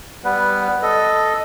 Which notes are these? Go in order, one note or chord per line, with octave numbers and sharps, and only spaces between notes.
G3 B3 B4
A4 D#5